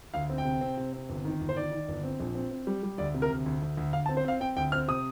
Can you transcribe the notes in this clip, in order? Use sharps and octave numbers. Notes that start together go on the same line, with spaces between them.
D2 F5
C4
G5
C3
C4
C3
C4
G1
D#3
G1
C5
D#3 D5
D#3
G1
C4
A#1
C4
C4
G3
G3
D2 D5
C3
A#4
D2
D2
D2
D2
D2 F5
A5
C4
C5
C4 F5
C4 G5
D2 G5
C4 F6
C3 D#6